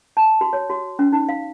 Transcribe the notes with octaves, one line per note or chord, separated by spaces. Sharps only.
A5
F#4
C#5
F#4
C#4
D#4
F5